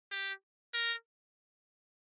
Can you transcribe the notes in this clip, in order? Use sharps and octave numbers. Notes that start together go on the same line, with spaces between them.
G4
A#4